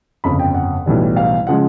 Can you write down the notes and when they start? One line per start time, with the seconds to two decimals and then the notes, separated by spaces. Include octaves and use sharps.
0.24 G1 F2 C#3 B5
0.39 G5
0.54 F#5
0.86 B1 A2 E3 G3
1.16 F5
1.47 C#3 F3 G#3 F#5